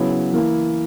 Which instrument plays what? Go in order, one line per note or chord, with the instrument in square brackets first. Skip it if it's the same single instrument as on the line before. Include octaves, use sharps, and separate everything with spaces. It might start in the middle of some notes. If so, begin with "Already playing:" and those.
Already playing: [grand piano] C#3 F#3 B3 E4
E3 A#3 E4